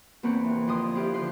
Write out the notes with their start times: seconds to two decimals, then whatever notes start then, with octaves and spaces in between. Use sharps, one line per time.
0.23 E2 A#3 C4 B4 C#6
0.44 C3 E3
0.67 F2 D3 C6 D#6
0.95 E4 F4 G4 B4 C5
1.14 D3 E3 F3 B4 C5 C6